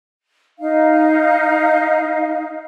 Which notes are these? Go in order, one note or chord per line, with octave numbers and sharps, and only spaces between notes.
D#4 F5